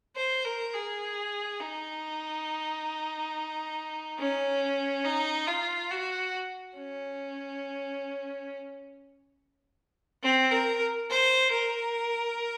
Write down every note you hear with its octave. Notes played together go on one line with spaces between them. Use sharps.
C5
A#4
G#4
D#4
C#4
D#4
F4
F#4
C#4
C4
A#4
C5
A#4